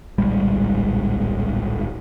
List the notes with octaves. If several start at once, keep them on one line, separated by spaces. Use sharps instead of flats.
D1 A#1 G3 G#3